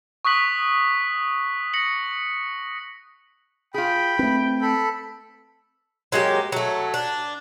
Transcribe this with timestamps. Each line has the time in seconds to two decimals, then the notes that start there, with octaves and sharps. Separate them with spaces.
0.25 C#6 D#6 F#6 B6 F#7
1.73 A#6 C#7 F#7
3.74 F4 G#4 G5 B5
4.19 A3 C4 B4
4.62 A4 B5
6.12 F#3 G#3 A#3 G4
6.52 F#3 A3
6.94 D4